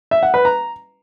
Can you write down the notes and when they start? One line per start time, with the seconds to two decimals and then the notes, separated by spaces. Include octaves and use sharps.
0.11 E5
0.23 F#5
0.34 B4
0.45 A#5